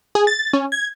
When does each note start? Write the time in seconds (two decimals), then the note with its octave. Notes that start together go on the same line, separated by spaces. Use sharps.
0.15 G#4
0.27 A6
0.53 C#4
0.72 G#6